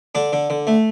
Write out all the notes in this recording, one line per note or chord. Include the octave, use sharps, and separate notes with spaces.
D3 D4
D3
D3
A3